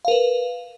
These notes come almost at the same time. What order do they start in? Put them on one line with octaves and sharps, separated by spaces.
F5 A#4 B4